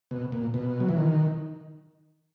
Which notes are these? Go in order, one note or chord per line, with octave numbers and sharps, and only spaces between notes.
B2
A#2
B2
F#3
E3
D#3